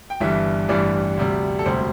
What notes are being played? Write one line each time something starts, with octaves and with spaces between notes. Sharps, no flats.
G5
G1 G2 E3 G3 E5
A1 G2 E3 G3 D5
D2 C3 G3
A4
E1 D2 C3 G3 C5